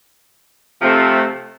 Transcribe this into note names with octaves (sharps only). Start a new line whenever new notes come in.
C3 F3 A3 C4